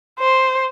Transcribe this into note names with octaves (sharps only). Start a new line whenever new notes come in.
C5